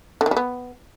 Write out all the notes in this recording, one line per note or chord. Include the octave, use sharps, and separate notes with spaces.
D3
D#3
G3
B3